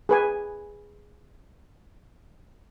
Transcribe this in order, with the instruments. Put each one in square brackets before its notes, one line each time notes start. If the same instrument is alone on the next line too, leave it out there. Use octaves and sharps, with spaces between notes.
[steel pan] G#4 B4 G#5